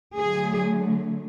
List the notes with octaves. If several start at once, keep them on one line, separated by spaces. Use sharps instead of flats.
D3 F#3 A3 G#4